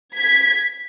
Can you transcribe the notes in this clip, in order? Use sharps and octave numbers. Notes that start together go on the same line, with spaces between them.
G#6 B6